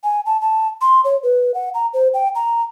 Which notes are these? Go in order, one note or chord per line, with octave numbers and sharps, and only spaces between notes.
G#5
A5
A5
C6
C#5
B4
F#5
A#5
C5
G5
A#5